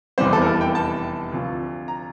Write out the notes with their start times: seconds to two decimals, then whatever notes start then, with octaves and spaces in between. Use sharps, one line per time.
0.18 F1 E2 E3 G3 C4 C5
0.33 A4
0.42 A#4
0.46 A4
0.61 G5
0.75 A5
1.32 D2 C3 F3
1.88 A#5